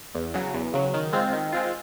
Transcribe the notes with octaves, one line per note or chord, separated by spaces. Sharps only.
E2
C#3 F#3
E2
C#3 F#3
D#3
G#3 C4 F4
D#3
G#3 C4 F4